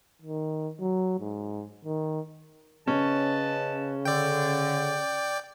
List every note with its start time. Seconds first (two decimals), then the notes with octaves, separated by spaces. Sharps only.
0.22 D#3
0.80 F#3
1.20 G#2
1.85 D#3
2.88 C#3 C#4 B4 D#5 A5
4.05 D3 D5 G5